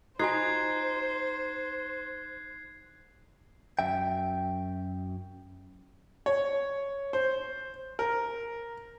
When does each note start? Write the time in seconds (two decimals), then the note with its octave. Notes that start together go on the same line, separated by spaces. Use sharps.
0.19 D#4 F4 F#4 C5 G#5 F#6 G#6 C7
3.79 F#2 E5 G5
6.26 C#5
7.13 C5
7.99 A#4